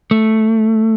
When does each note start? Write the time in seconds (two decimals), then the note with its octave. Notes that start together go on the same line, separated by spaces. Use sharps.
0.11 A3